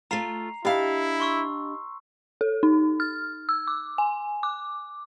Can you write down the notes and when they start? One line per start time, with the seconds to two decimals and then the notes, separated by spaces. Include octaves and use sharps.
0.11 A3 F4 A#5 C7 F7
0.65 D4 E4 G4 D#5 F5 B5
1.20 C6 C#6 E6
2.41 A4
2.63 D#4
3.00 F6
3.49 E6
3.68 D6
3.98 G#5
4.43 D6